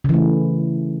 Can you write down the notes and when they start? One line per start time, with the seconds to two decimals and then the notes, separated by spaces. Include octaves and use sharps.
0.04 C#3
0.09 E3
0.14 A3